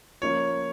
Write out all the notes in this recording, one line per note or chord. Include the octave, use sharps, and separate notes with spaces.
F3 A#3 C#4 F4 C#5